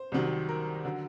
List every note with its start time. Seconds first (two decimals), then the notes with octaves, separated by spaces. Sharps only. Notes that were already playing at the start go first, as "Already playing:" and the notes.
Already playing: C5
0.12 C2 C3 D#3 F#3
0.49 A#4
0.85 D3 F#3